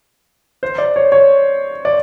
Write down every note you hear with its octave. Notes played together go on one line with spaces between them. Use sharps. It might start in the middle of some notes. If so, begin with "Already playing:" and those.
C5
D5
C#5
C#5
D5